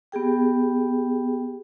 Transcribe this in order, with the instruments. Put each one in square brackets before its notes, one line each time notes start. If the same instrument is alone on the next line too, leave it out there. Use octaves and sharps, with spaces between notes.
[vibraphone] B3 G4 G#4 G5